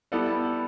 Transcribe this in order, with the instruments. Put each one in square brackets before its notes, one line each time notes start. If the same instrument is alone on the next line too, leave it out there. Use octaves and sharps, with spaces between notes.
[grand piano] G3 B3 E4 A4